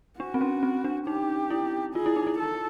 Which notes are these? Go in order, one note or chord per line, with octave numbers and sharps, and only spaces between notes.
D4 F#4
C4
C#4
C4
D4
D#4 G4
E4
F4 G#4
E4
D#4
E4
A4